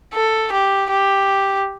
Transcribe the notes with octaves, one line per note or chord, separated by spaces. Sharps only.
A4
G4
G4